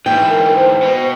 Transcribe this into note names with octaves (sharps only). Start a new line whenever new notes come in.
G#2 E3 G5
A#4
C5
B2